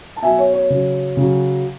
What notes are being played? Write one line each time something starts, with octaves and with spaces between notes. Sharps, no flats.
A5
B2 F#3 E5 G#5
C#5
C#5
C#3 F#3
C#3 F#3